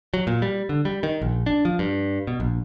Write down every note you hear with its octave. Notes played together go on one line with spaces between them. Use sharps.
F#3
A#2
G3
D3
G3
D#3
A#1
D4
F3
G2
B2
A#1